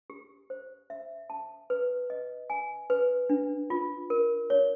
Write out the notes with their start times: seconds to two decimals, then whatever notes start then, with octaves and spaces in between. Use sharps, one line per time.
0.10 G4
0.50 C5
0.90 E5
1.30 A5
1.70 B4
2.10 D#5
2.50 G#5
2.90 B4
3.30 D4
3.70 F4
4.10 A#4
4.50 C#5